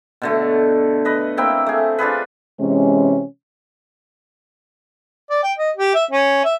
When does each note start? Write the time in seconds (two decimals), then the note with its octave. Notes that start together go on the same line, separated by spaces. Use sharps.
0.22 B2 D3 A3
1.05 B4 D#5
1.37 A#3 C4 E4 G5
1.66 A3 G#4
1.99 D4 F4 G#4 B4
2.60 C3 E3 G#3 C#4
5.30 D5
5.43 G5
5.58 D#5
5.77 G4
5.94 E5
6.11 C#4
6.44 E5